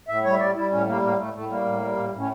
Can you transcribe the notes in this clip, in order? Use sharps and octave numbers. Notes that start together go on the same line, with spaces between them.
A2 E5
G3 C#5
E5
G3 D5
G3 E4
A2 C#4
G3 A#3
A2 A#3
A2 A3
A2 A3
G3 A#3
A2
G3
A2
A2
C#4